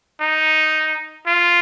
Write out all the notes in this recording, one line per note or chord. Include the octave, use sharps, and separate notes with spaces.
D#4
F4